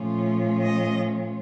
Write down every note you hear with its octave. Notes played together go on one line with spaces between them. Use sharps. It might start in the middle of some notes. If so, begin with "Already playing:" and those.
Already playing: A#2 F3 A3 C#4 F4
D#5